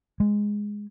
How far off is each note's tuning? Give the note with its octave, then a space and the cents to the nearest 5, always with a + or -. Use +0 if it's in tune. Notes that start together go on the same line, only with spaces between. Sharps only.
G#3 -5